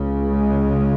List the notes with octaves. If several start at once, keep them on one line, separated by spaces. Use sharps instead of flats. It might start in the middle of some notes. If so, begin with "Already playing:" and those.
Already playing: C#2 C#3
G#3